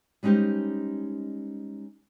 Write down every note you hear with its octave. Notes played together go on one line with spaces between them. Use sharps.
G3 G#3 C#4 D#4 G4 C5